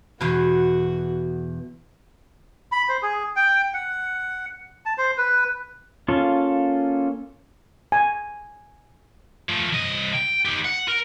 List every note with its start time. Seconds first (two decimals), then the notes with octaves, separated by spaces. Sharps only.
0.21 E2 B2 F#4
2.72 B5
2.89 C5
3.02 G#4
3.36 G5
3.74 F#5
4.86 A5
4.98 C5
5.18 B4
6.08 A#3 C#4 F4 A4 F5
7.92 G#5
9.49 F3 A3
9.72 C2 D#5
10.14 G5
10.45 D#4 G4
10.65 F#5
10.88 A#4